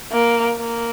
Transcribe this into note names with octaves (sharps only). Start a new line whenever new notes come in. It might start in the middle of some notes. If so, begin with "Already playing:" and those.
A#3
A#3